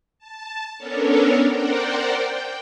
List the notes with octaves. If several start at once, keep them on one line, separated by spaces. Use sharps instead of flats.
A5
B3 C#4 D4 A4 A#4 C#5
A#4 C5 D5 F#5 G5
G5